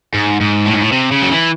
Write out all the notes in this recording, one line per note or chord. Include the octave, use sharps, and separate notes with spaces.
G#2
G#2
A2
G#2
A2
C3
C#3
F#3
E3